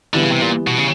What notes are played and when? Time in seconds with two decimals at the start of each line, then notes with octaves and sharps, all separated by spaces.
0.14 D3 E3 G3 B3 E4
0.23 C#3
0.32 C3
0.42 A#2
0.67 B2
0.79 C#3